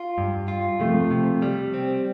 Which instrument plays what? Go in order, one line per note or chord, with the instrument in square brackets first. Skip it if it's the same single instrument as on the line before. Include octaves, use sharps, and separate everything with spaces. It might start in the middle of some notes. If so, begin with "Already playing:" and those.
Already playing: [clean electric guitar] F4
G2
F4
[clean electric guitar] C3 [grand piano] F3 A3
[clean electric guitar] C3
G3
C4